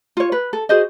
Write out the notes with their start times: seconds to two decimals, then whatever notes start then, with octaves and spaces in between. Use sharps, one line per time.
0.17 F4 C#5
0.32 B4
0.53 A4
0.69 F#4 G#4 C5 D#5